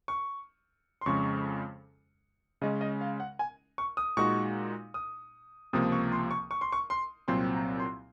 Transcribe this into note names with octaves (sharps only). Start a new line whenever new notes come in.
C#6
C6
F2 C#3 G#3 C#6
C#3 G#3 C#4 D#5
D#5
F5
F#5
G#5
C#6
D#6
A#2 G#3 D#4 F#4 C#6
D#6
C#2 C3 F3 A#3 D#6
C#6
C6
C#6
C#6
C6
C#6
C6
C2 A#2 F#3 C4 C6
A#5
C6